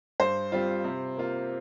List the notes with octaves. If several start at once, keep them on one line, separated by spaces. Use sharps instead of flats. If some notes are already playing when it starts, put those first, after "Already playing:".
G2 C5
G3 C4 F4
C3
A#3 F4